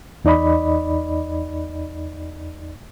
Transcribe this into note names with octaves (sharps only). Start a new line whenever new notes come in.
E2 D#4 D5 D#5 B5